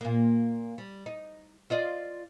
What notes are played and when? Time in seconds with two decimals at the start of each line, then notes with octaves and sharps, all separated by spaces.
0.01 A#2 A#3
0.78 G3
1.06 D#4
1.70 F4 D5 D#5